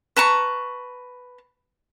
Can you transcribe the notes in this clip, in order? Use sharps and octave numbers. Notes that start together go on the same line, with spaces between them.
B4 A5 A#5 C#6